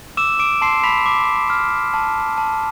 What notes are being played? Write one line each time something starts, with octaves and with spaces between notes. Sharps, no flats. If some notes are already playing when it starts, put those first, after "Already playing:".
D6 E6 E7
D6 D7
A5 C6 C7
B5 B6
D6
F6
A5
A5